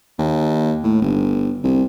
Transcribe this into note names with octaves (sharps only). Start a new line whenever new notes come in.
D#2
A2
G1
C2